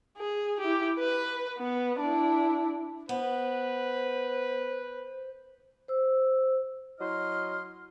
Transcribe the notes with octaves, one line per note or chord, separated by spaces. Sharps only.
G#4
E4 G4
B4
B3
D4 E4
B3 B4 C5
C5 E6
F#3 E4 D#5 C6 F6